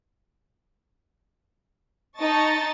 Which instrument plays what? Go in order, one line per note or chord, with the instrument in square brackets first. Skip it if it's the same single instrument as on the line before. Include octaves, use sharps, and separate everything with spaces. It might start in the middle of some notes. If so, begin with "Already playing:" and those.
[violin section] D#4 D#5 A5 C#6 A6